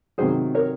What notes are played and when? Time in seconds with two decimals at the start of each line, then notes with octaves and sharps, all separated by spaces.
0.18 C3 D#3 F#3 G#4 C5
0.55 A#4 C#5